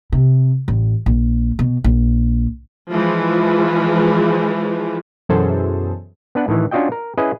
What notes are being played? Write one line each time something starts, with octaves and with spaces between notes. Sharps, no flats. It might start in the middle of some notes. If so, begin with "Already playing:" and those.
C3
A1
A#1
B2
A#1
E3 F3 G#3
F#2 B2 E3 G#4 A4 C5
B3 D4 B4 F#5
A2 D#3 E3
C#4 D4 F4 F#4 D#5 G5
A#4
C#4 E4 G#4 B4 D#5